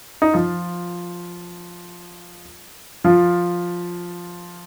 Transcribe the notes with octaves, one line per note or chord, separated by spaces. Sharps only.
D#4
F3 F4
F3 F4